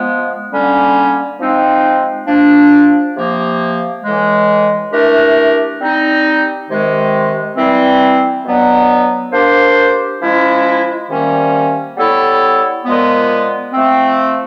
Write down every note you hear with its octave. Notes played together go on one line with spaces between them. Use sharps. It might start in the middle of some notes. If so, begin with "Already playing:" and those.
Already playing: F3 G#3 B3
D3 G3 A#3 C#4
F3 G#3 C4 D#4
F3 A#3 D4
C3 F3 A#3
A2 E3 G#3
E3 A3 D4 G4 A#4
G3 C4 D#4
C3 D#3 G#3
E3 G3 C4
B2 F#3 B3 D4
A#3 D4 G4 C5
F3 G#3 C#4 E4
C3 D#3 G3 A#3 C#4
G3 B3 E4 A4 C#5
A#2 F3 G#3 B3
F3 A3 C4